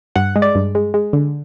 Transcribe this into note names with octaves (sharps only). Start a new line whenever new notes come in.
G2 F#5
G#3
D5
G2
G#3
G#3
D3